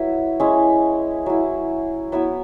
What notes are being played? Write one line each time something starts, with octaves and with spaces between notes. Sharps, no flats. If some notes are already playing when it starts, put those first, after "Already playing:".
Already playing: F#3 E4 B4 E5 F#5
G#3 C#4 E4
F#3 E4
F#3 B3 E4 B4 E5